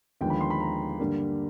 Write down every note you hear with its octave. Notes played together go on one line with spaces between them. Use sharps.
D#2 D3 F3 G#3 B3 G5
B5
C6
B5
A#5
G2 D3 G3 A#3